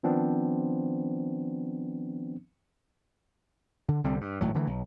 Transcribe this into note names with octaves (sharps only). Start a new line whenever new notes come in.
D#3 F3 B3 C4 D4
D3
C2 D3 G3 C4
G2
G#1 A2 F#3
D3 E3 G3 A3
B1